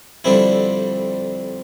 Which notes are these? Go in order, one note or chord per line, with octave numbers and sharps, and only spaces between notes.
F2 D3 G3 C4 E4